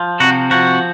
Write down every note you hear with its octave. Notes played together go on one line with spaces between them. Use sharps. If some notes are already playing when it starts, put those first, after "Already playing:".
Already playing: F3
C3 F#4
F3 F#4